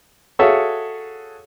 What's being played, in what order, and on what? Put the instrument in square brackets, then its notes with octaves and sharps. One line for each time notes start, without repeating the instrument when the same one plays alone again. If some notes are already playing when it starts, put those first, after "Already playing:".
[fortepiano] F#4 G#4 A4 C#5 E5 F5